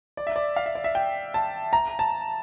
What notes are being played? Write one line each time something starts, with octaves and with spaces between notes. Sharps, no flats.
D5
E5
D5
F5
E5
D5
E5
G5
A5
A#5
A5